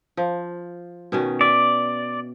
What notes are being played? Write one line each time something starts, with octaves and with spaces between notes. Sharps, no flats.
F3
B2 D#3 C#4
D5 E5